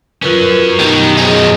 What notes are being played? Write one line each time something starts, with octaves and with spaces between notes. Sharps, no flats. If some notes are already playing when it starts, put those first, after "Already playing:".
F#3 C#4 F4 A#4 B4
F#2 B2 D#3 G4
F3 D#4 G#4 G#5